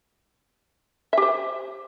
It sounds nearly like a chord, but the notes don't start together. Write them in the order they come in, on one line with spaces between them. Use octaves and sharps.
E5 G4 C5